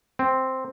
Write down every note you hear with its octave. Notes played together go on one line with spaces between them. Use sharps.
C4